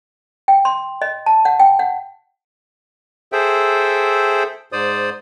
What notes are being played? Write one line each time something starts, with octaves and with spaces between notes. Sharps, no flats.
G5
C6
D#5
A5
F#5
G5
F#5
G#4 A4 C5 E5 G5
G#2 C5 D5 D#6